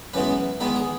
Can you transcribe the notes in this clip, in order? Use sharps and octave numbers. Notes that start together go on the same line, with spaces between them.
F#2 E3 G#3 B3 B4
E2 D#3 G#3 B3 B4
G#4